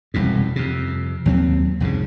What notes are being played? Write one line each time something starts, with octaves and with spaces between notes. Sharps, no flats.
E1 C2 F2 G#2
F2 C3
D#2 F#3 A3 C4
C2 F2 G#2 C#3